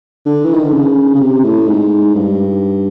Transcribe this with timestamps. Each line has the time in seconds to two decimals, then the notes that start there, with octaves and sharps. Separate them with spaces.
0.26 D3
0.45 E3
0.54 D#3
0.64 D3
0.73 C#3
1.15 C#3
1.21 C3
1.45 A2
1.68 G#2
2.15 G2